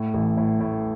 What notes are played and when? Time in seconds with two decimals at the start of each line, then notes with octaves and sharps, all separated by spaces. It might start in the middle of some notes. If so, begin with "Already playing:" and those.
Already playing: A2
0.14 A1
0.37 A2
0.60 A2